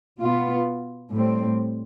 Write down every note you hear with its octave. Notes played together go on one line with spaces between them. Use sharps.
B2 B3 F4
A2 G3 C4